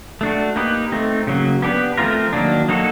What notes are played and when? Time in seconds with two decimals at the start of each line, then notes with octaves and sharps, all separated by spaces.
0.21 A3 D4 F#4
0.56 A#3 D#4 G4 B4
0.92 A3 C4 D#4
1.27 C#3 F#3 A#3
1.62 B3 D4 G4 B4
1.97 F3 A3 C4 F4 A#4
2.33 D#3 F#3 A#3 D4
2.68 F#3 A#3 D#4 F#4 A4